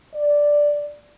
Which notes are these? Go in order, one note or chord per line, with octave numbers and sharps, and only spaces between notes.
D5